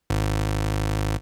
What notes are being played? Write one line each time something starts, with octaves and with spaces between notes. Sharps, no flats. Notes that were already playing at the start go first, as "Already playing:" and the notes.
G#1